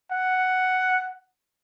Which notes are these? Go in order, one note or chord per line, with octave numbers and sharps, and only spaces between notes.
F#5